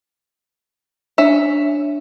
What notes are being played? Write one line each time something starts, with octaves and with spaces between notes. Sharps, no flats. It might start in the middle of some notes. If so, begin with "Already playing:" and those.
C#4 D4 E5